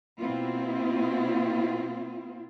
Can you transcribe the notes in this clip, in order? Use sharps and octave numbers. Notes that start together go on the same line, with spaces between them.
B2 A#3 C4 E4 F4